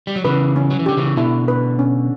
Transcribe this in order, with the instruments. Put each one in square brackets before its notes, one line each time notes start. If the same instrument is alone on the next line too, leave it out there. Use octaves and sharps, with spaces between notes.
[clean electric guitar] G3
F#3
[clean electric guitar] C#3 E3 [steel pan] B4
[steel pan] C#4
[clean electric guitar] F#3
E3
[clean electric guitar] D3 [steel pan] G4
[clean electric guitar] C#3 E3
[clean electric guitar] B2 D3 [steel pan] E4
[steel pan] B4
C#4